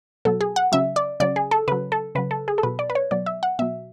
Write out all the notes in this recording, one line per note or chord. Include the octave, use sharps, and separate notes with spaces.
B2 F#3 A4
G#4
F#5
C#3 F#3 E5
D5
C#3 F#3 D5
G#4
A4
C#3 F#3 B4
A4
C#3 F#3 B4
A4
G#4
A4
B2 F#3 B4
D5
B4
C#5
B2 F#3 D5
E5
F#5
B2 F#3 E5